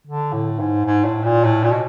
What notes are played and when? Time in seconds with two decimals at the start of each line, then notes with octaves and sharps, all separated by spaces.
0.07 D3
0.33 A2
0.59 G#2
0.85 G#2
1.04 A2
1.24 A#2
1.44 A2
1.63 A#2
1.72 B2